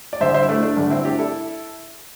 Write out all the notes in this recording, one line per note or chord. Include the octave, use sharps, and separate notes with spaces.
D5
A1 G2 D3 C5 E5
C5 E5
E4
A3 D4
A3 D4
G1 G2 D3 A3 D4
C4 E4
D4 G4
E4 A4